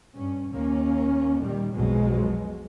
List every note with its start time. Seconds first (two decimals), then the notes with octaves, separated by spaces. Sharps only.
0.14 G2 C#4
0.53 D#2 A#3 C#4
1.42 A#2 D#3 G3
1.75 B1 F2 B2 F#3 G#3